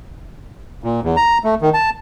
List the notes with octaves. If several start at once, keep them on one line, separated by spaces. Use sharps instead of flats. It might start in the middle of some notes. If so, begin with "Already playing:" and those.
A#2
E2
A#5
A3
D#3
A5